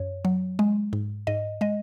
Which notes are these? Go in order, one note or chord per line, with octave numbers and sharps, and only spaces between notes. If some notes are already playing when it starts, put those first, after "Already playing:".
Already playing: F#2 C#5
F#3
G#3
G#2
G#2 D#5
G#3 D#5